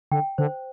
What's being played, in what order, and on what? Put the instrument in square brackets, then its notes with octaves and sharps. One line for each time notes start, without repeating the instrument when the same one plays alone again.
[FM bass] D3 [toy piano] G5
[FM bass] D3 [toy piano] C5